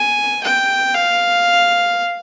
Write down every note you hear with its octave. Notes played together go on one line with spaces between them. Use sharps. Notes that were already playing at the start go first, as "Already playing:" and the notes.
Already playing: G#5
G5
F5